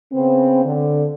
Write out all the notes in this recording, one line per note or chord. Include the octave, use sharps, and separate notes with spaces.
C#3 B3 C4
D3